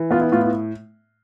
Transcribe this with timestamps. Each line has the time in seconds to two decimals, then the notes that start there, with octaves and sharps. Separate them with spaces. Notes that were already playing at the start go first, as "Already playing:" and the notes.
Already playing: E3
0.11 B3 F4
0.21 E4
0.32 A2 F4
0.43 F4